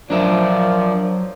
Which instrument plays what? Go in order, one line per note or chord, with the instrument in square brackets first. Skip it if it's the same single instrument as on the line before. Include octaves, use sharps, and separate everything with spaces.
[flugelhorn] F3 [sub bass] F#3 [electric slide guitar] D4 A#4 E5 [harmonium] D5